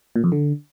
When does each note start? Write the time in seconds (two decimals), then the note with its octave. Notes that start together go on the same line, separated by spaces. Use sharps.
0.16 A#2
0.24 F2
0.32 D3